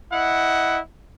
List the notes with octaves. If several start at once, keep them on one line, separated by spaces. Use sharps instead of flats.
E4 D#5 F#5